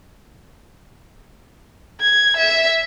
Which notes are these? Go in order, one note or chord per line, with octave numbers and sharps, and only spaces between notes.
G#6
E5